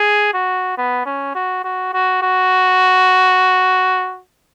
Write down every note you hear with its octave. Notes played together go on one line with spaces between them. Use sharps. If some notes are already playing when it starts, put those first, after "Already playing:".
Already playing: G#4
F#4
B3
C#4
F#4
F#4
F#4
F#4